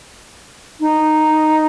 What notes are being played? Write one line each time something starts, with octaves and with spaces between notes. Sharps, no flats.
D#4